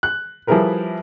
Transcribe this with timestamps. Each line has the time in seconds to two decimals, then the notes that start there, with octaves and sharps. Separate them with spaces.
0.03 F#6
0.47 F3 G3 E4 G#4 A#4 B4